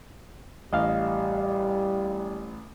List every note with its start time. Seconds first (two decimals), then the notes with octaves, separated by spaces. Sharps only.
0.73 A1 G3 D#5 F5